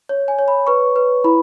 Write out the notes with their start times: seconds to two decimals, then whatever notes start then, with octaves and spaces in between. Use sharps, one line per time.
0.09 C#5
0.28 G#5
0.39 C#5
0.48 B5
0.67 B4 C#6
0.96 B4
1.24 E4 B5